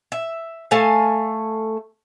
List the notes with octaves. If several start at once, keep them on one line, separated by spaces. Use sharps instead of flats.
E5
A3 A4 F5 G#5